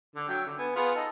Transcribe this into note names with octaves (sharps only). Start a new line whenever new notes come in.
D3
F#3 E5 G5
D3
B3 G#5
B3 F4 G#4
D#4 A4